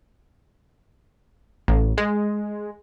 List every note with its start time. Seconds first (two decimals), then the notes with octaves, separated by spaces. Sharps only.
1.68 A1
1.98 G#3